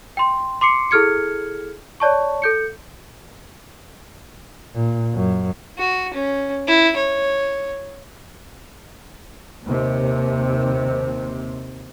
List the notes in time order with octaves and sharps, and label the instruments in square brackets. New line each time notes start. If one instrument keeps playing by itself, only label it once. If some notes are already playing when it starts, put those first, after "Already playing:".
[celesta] G5 C6
C6 D6 C7 C#7
E4 G#4 A4 F6 G#6 C#7
C#5 D5 A5 C#6
A4 G6 C#7
[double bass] A#2
F#2
[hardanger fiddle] F#4
C#4
E4
C#5
[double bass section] D#2 C3